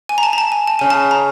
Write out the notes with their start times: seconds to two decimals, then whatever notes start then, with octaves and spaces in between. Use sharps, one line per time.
0.09 G#5
0.18 A#5
0.23 A5
0.33 A#5
0.38 A5
0.52 G#5
0.67 A5
0.79 C#3 G#5
0.90 A5
1.11 A#5